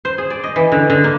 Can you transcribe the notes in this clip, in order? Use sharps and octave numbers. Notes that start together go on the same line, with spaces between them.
C5
G#4
D5
D#5
E3
D3
D3
A#3